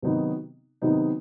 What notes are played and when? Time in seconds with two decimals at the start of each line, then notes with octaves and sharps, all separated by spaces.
0.02 C3 D#3 F#3 B3 D#4
0.82 C3 D#3 F#3 B3 D#4